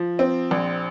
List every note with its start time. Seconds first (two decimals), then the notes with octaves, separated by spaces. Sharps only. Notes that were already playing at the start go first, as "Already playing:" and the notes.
Already playing: F3
0.19 C4
0.51 A#1